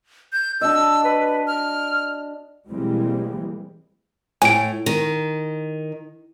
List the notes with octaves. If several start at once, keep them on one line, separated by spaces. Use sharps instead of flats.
G6
D4 F#4 D#5 E6
B4
F6
B2 E3 G3 G#3 A#3 C4
A2 G#5 D7
D#3